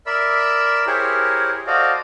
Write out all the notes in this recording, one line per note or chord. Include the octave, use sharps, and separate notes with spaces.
A#4 D5 E5 B5 E6
E4 G4 G#4 A#4 C5 C#5
F#4 A4 C5 D5 D#5 F5